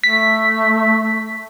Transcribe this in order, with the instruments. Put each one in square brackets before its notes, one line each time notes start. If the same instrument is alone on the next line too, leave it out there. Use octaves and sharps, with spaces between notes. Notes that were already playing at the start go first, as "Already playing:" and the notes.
[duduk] A3 [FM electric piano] B6